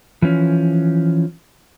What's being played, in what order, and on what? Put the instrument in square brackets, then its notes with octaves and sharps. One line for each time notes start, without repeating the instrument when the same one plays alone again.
[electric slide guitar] E3 F3 C#4